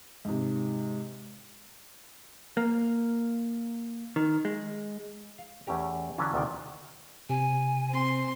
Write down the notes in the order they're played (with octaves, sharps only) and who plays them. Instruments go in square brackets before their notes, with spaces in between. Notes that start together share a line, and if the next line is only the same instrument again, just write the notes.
[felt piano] G#2 C3
[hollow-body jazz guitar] A#3
D#3
G#3
[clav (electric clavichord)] F5
E2 A3 C#4 G4 A#5
D3 E3 F#3 C#4 D4
D2 C3 D#3 F4 G5
[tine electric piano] C3 [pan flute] G#5
[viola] C4 C6